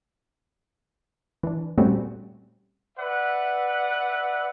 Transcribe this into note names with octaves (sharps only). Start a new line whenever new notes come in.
E3 D4
A#2 G3 A3 C4 C#4 F#4
B4 D5 E5 F#5